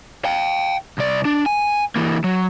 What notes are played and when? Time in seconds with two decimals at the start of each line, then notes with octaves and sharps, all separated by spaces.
0.25 F5 G5
0.98 C2 D5
1.25 D4
1.46 G#5
1.96 E3 A#3
2.24 F#3